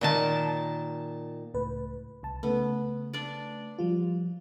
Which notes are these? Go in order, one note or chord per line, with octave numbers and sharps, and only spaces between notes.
A#2 D#3 A5
C#2 A2 B4
C2 A5
C#3 A3 B3
D4 D5
F3 G3 F4